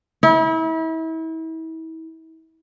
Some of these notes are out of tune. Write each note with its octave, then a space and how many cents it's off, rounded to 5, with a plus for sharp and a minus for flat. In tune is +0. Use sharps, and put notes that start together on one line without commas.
E4 -35